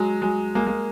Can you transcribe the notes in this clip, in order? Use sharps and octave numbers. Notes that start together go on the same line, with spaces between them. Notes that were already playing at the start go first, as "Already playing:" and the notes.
Already playing: F#3 G#3
F#3 G#3
G#3 A#3
G#3 A#3